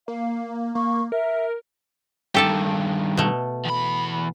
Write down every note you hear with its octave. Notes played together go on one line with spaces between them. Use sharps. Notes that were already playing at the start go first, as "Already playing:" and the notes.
A#3 F5
A#3 C#6
A#4 E5
G2 D#3 G4 A4 A5
B2 A3
E2 B5